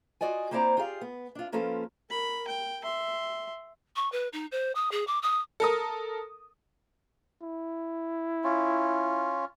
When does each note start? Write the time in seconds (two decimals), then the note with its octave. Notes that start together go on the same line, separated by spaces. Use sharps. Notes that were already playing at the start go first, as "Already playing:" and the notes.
0.21 F4 F#4 D5 D#5 G#5
0.51 A#3 C4 E4 C5 D5 A#5
0.77 F4 G4 G#4 D5 F5
1.01 B3
1.35 D4 F4
1.52 F3 A#3 C#4 F4 A4 B4
2.10 A#4 B5
2.48 G5
2.83 E5 C6
3.96 C#6
4.12 B4
4.33 D#4
4.52 C5
4.75 D#6
4.91 G#4
5.07 D6
5.22 D#6
5.60 A4 A#4 D#6
7.42 E4
8.44 C#4 F4